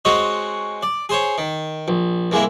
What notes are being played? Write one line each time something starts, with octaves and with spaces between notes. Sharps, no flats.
G#3 C4 F#4 C#5 D#5
D5
G#4 C5 C#5
D#3
A#1
C2 G#3 A#3 E4